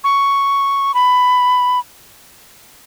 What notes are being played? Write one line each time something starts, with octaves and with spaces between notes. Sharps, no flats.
C#6
B5